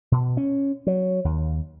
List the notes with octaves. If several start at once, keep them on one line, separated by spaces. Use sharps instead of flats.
B2
C#4
F#3
D#2